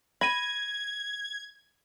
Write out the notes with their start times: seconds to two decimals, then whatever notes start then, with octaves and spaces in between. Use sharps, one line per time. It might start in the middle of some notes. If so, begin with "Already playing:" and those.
0.21 B5 G#6 A#6 D#7